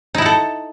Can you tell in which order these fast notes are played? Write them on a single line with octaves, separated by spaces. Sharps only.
D#4 E4 F#5 A4